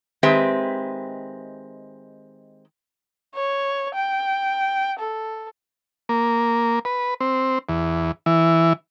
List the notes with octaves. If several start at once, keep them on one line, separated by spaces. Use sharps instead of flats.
D#3 G#3 C4 G4 B4 E5
C#5
G5
A4
A#3
B4
C4
E2
E3